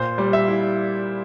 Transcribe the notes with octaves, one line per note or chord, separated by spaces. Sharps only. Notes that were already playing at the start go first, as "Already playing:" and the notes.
Already playing: A#2 C5
G3
E5
E4